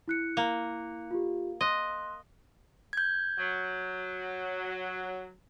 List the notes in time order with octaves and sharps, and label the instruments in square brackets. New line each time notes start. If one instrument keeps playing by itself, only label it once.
[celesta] E4 F#6 C#7
[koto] A#3
[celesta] F4 G4
[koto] D#5 [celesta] C6 F#6
[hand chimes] G6 G#6
[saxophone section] F#3